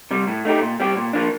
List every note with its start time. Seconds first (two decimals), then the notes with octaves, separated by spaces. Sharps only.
0.11 C3 G3
0.28 A2
0.45 A3 D#4 G4
0.61 A#2
0.80 G3 C4 G4
0.97 A#2
1.13 F3 A#3 D4